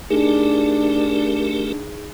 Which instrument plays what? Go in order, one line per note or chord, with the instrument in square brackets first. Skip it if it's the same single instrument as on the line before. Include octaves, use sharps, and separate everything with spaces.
[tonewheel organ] A3 G4 A#4 [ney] D4 [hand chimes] D#4 G#4